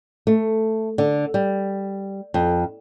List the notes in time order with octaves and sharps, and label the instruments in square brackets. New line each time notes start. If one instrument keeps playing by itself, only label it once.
[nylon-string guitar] A3
D3
G3
F2